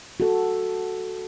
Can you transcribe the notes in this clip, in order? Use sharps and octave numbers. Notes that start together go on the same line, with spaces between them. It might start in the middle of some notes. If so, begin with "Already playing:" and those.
F#4 A4